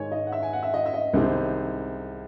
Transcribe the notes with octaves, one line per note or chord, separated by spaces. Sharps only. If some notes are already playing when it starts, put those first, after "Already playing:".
Already playing: G#2 D#3 G#3 C#5 G#5
D#5
F#5
E5
G#5
F#5
E5
D#5
E5
D#5
C2 C3 D#3 G#3 C4